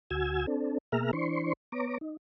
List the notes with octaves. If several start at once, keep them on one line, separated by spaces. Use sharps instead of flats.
D2 F#4 G#5 E6 G#6
C4 D4 A4
B2 A#3 G#4 E5 A#5 F6
E3 D4 C5 C6 C#6
B3 C#5 A#5 D6
D#4